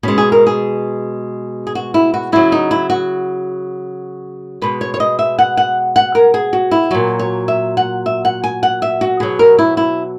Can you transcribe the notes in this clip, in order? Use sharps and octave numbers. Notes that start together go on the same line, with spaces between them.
B2 G#3 C#4
G#4
A#4
G#4
G#4
F#4
E4
F#4
C#3 F#3 E4
D#4
E4
F#4
B2 G#3 B4
C#5
C#5
D#5
E5
F#5
F#5
F#5
A#4
G#4
F#4
E4
A#2 F#3 F#4
C#5
E5
F#5
E5
F#5
G#5
F#5
E5
F#4
B2 F#3 G#4
A#4
E4
E4